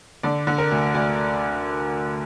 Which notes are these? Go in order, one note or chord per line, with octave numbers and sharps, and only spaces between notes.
D3 D5
D3
A#4
D2
D2 D5